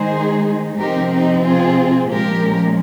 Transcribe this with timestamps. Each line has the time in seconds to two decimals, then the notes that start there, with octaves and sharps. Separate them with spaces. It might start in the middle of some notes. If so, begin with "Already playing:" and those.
Already playing: D#3 G#3 D#4 G#4 C5
0.80 C3 F3 C4 D#4 G4 A#4
1.12 D#4 G4
1.45 F4 G#4
2.10 A#2 F3 G#3 C#4 G4 A#4